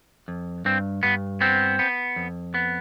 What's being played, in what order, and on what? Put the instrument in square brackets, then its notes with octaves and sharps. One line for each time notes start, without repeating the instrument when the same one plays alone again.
[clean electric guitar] F2
G2 C4
G2 B3
B3 C4
B3
F2
B3